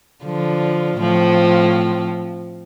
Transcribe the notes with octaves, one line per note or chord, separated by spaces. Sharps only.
D3 F3
A2 F3 C4